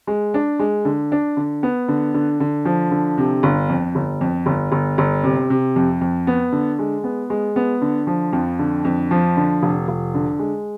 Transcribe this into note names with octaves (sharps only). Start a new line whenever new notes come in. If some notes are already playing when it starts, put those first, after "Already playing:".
G#3
D4
G#3
D3
D4
D3
B3
D3
D3
D3
F3
D3
C3
G1
F2
G1
F2
G1
G1
G1
C3
C3
F2
F2
B3
D3
G#3
B3
G#3
B3
D3
F3
F2
D3
F2
F3
D3
F1
F1
D3
G#3